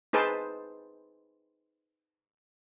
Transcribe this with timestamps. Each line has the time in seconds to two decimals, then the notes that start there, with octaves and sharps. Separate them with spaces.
0.13 D#4 G#4 B4 C5 A5